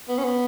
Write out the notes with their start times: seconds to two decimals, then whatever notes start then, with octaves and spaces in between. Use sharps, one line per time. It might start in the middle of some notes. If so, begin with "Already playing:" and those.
0.09 B3
0.18 C#4
0.25 B3